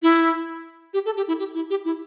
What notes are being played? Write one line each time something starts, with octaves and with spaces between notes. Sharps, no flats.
E4
G4
A4
G4
E4
G4
E4
G4
E4